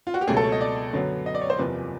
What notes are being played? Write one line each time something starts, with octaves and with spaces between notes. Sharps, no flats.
F4
F#4
G4
C#2 B2 F#3 A3 G#4
A4
C#5
D#5
D5
F#2 D3 F#3 B3
D#5
D5
C#5
C5
F#1 E2 C3 F3 B4